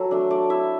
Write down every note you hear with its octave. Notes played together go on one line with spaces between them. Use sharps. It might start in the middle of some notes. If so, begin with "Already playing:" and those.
Already playing: F#3 A4
A3 D4
A3 D5
E4 E5